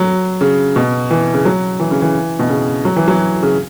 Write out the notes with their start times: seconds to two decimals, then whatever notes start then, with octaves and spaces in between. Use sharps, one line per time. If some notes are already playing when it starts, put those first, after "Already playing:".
Already playing: F#3
0.41 C#3
0.76 B2
1.11 E3
1.34 C#3
1.45 F#3
1.80 E3
1.91 C#3
2.02 E3
2.39 B2
2.50 C#3
2.85 F#3
2.96 E3
3.08 F#3
3.43 C#3